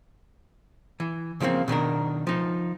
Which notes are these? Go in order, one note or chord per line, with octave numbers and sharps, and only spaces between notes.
E3
C#3 F3 G3 A#3 C4
B2 D#3 D4 A#4
F3 D#4